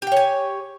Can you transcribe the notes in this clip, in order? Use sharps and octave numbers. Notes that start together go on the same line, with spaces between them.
G4 C#5 G5 G#5